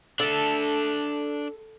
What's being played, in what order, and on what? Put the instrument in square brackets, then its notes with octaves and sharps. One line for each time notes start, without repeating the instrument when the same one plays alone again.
[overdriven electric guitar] D4 E5 [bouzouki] A4